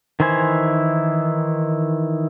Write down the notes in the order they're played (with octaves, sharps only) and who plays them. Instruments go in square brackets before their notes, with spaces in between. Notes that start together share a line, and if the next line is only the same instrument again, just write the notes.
[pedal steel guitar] D#3 E3 E4 C5 G#5